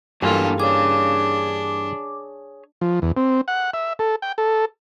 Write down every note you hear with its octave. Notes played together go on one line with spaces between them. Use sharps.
G2 E3 F#3 A#3 D4 F4 A4 G#5
D4 G#4 C#5 D6
F3
E2
C4
F#5
E5
A4
G5
A4